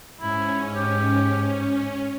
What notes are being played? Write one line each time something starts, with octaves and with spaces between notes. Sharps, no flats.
G#2 C#4 E4
G4